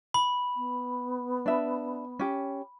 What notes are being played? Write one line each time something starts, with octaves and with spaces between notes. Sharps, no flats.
B5
B3
D4 E5
C#4 G4